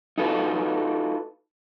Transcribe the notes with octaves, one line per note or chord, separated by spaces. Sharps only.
D#4 F4 F#4 A4 B4